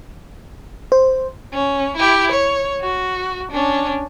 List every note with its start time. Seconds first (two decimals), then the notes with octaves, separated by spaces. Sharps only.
0.92 C5
1.53 C#4
1.97 E4 G4
2.31 C#5
2.81 F#4
3.51 C#4 D4